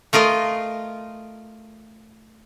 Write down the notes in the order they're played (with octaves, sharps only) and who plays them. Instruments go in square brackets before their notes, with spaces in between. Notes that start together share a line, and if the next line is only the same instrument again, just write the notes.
[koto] A3 F4 A#4 D#5